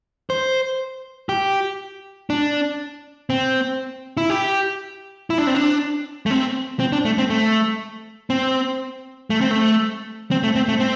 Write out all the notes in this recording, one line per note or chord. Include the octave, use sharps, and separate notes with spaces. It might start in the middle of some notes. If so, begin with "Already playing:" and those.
C5
G4
D4
C4
E4
G4
E4
D4
C4
D4
A3
C4
C4
D4
A3
C4
A3
C4
A3
C4
A3
C4
A3
C4
A3
C4